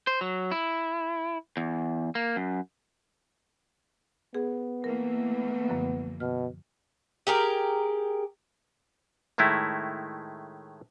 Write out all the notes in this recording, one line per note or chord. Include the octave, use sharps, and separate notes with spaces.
C5
F#3
E4
E2
A#3
F#2
B3 G#4
E3 A3 A#3 A#4
F#2 D3 F3
B2 F6
G4 G#4 A#4
A2 D#3 G#3 A3 E4